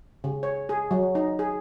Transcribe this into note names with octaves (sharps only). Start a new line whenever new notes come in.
C#3
C#5
G#4
F#3
D#4
G#4